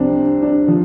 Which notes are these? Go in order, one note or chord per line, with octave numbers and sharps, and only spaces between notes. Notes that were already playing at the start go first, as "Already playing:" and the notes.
Already playing: C2 C3 F3 G3 C4 D4
D4
F3